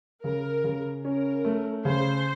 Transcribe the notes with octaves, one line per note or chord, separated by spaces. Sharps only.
C#3 A#4
C#3
C#4 A#4
A3
C#3 C5